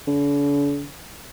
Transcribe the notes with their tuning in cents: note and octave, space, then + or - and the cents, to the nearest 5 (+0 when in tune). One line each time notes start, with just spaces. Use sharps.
D3 -45